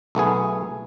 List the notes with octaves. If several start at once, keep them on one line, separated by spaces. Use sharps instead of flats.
B1 A3 B3 G#4